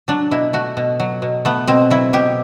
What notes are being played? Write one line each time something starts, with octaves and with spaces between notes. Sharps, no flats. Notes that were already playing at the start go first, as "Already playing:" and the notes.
F#3 D4
B2 E4
A3 F#4
B2
F#3
B2
A3 B3
B2 C4
F#3 E4
B2 G4